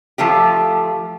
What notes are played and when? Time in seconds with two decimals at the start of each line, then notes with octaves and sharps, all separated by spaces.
0.18 F3 A3 F4 G4